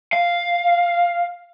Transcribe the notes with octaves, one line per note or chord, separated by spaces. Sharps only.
F5